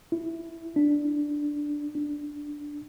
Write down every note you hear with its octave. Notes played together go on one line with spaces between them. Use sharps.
E4
D4
D4